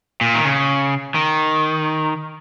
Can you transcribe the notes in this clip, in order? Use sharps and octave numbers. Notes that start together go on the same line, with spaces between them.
A#2
D#3
C#3
D#3